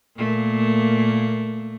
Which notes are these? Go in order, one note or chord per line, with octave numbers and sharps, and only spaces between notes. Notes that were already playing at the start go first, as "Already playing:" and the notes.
A#2 A3 A#3